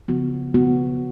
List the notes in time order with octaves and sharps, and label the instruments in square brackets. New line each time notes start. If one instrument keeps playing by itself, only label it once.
[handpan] C#3 F3 B3 F#4
C#3 F3 B3 F#4